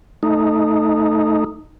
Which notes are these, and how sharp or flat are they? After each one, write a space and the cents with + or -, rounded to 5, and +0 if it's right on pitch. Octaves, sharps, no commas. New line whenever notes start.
A3 +0 D#4 +0